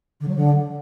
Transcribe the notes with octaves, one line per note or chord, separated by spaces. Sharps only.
D3
F#3
D3